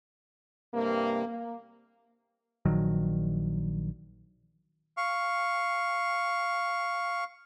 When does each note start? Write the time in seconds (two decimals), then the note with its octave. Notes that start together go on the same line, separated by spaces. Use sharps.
0.74 G2 C3 A#3
1.25 A#3
2.66 A#1 D#3 F#3
4.97 F5 C#6